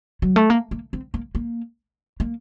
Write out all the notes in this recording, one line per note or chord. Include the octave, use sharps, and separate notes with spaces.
F#3
A3
A#3
A#3
C4
A#3
A#3
A#3